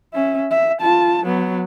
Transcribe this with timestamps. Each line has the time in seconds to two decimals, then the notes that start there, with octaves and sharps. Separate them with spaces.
0.14 C#4 E5
0.51 E5
0.81 F4 A5
1.25 F#3 B3